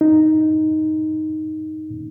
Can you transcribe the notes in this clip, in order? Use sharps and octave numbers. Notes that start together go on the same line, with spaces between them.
D#4